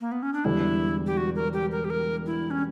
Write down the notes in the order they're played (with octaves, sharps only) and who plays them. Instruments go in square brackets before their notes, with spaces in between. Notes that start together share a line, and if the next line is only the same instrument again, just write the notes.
[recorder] A#3
B3
C#4
D4
[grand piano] E1 E2 D3 G3 [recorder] E4
[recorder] G4
F#4
A#4
G4
A#4
G4
A#4
E4
C#4